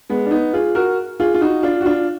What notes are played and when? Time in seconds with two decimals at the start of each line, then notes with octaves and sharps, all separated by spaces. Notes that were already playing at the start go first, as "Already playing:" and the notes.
0.09 G#3 B3
0.26 D4
0.31 B3 D#4
0.53 F4 G#4
0.75 F#4 A#4
1.20 F4 G#4
1.34 F4
1.41 D#4 F#4
1.63 D4 F4
1.81 F#4
1.85 D4 F4